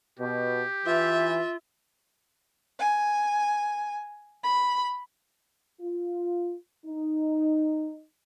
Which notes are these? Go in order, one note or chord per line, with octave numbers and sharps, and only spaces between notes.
B2 G4
E3 F4 E5
G#5
B5
F4
D#4